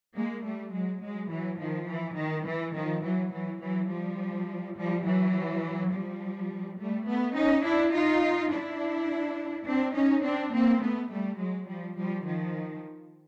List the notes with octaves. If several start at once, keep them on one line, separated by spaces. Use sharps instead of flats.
G#3 A#3
G3 A3
F#3 G#3
F#3 G#3
E3 F#3
D#3 F3
E3
D#3
E3
D#3 F3
E3 F#3
E3 F#3
E3 F#3
F3 G3
F3 G3
E3 F#3
F3 G3
G3 A3
A3 B3
C#4 D#4
D4 E4
D#4 F4
D4 E4
C4 D4
C#4 D#4
C4 D4
A#3 C4
A3 B3
G3 A3
F#3 G#3
F3 G3
F3 G3
D#3 F3